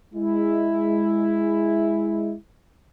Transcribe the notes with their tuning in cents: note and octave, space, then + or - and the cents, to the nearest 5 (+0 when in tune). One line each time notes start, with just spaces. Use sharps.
G#3 +0 E4 +0